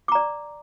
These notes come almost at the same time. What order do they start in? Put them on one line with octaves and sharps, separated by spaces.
D6 A#5 D5